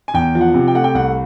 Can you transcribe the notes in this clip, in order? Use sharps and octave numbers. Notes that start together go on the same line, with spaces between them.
G#5
E2 G5
F3
F#5
C3
G5
A3 F#5
G5
C2 F#5